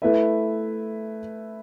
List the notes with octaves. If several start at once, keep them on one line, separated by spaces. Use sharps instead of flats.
A3 E4 B4 E5